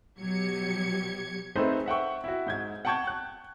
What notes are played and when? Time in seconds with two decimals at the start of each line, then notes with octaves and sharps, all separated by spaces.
0.20 B2 F#3 G4 G#6 C#7
1.55 A3 C4 D#4 G#4 B4 C5
1.86 E5 F#5 G5 C#6
2.24 E4 F#4
2.46 G#2 G6 G#6
2.85 F#5 G5 A5 C#6 G6 G#6
3.07 F#6